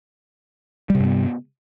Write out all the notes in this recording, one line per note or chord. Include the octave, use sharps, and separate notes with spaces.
G2 C3 G3 B3